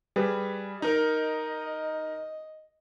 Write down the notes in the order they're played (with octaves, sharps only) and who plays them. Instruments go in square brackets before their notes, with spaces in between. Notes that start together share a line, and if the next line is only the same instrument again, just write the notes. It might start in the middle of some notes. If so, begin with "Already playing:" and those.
[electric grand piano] G3 G#4 B4
[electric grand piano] D#4 A#4 [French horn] D#5